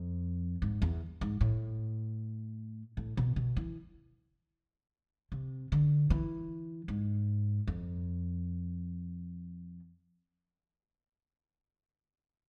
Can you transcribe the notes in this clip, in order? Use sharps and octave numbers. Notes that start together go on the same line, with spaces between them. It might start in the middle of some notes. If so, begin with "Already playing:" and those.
Already playing: F2
G#2
E2
G#2
A2
A2
B2
B2
E3
C3
D3
E3
G#2
F2